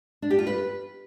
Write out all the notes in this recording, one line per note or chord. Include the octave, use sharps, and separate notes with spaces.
D4
G4
F4
B4